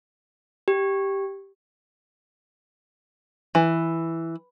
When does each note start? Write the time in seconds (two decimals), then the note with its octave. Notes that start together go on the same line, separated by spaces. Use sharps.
0.68 G4
3.55 E3